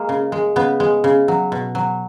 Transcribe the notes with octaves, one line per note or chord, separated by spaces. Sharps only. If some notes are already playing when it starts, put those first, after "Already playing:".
Already playing: G#3 A#3
C#3
G#3
C#3 B3
G#3
C#3
F#3
B2
F#3